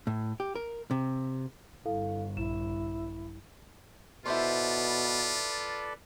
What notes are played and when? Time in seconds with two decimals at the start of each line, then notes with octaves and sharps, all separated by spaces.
0.07 A2
0.40 G4
0.55 A#4
0.91 C3
1.85 G1 E4 A4 F5
2.37 A#1 E4 E7
4.26 B2 E4 F4 A4 B4 C5 D5 C6